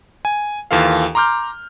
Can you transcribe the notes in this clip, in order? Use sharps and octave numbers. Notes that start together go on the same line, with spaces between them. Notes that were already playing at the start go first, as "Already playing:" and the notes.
G#5
D#2 E3 F4 A4 F5
A#5 C6 D6 F6 G6